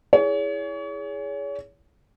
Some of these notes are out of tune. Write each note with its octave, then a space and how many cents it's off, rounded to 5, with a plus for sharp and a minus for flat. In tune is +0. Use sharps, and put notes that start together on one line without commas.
E4 +0 G#4 +0 C#5 +35